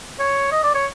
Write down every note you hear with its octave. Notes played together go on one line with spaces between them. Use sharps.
C#5
D#5
D5
C#5